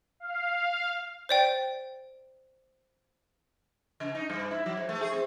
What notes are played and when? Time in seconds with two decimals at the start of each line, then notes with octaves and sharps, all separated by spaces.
0.20 F5
1.29 C5 D5 G5
4.00 C#3
4.15 D#4
4.30 G2
4.51 E4
4.66 F#3
4.77 G#2
4.89 A3
5.01 G#4
5.13 C4